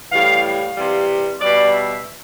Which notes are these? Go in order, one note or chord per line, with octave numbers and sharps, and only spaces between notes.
A2 E3 G3 F5
F5
C3 E3 G3
B2 G3 D5
E5